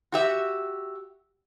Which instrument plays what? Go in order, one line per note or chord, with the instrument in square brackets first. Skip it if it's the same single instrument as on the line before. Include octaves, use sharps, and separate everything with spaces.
[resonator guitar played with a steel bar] F#4 G4 E5